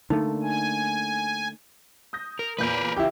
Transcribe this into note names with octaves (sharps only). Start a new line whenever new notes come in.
D3 A3 A#3 D#4
G#5
D#6 G6 A#6
A#4
E2 A#2 A#4 B4 G6
C#2 E3 E4 G4